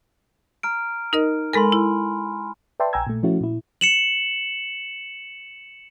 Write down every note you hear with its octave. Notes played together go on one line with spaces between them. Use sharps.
A#5 F6 D7
D#4 A#4 D#5
G#3 A4 A#4 G#5 B5 C6
E4
B4 D5 E5 G5 A5 C6
A#1 G5 G#5 A#5 E6 G#6
A#2 A3
F3 A3 C#4 E4 F#4
A#2 E4
C#7 E7 F#7